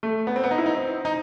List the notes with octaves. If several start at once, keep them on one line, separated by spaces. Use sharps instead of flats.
A3
B3
C4
B3
D#4
E4
D#4
C4
D#4